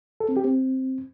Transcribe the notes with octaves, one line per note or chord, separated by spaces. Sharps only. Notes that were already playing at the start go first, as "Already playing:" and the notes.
A4
C4
G4
C4